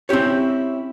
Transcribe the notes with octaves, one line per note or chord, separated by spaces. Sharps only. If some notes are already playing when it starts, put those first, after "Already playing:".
C4 C#4 E4 G4 C#5